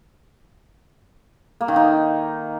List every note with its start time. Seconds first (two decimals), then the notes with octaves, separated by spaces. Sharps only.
1.61 A#3
1.68 D#3
1.76 D#4